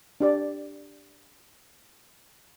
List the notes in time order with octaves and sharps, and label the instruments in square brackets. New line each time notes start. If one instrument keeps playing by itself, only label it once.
[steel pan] D4 G4 D5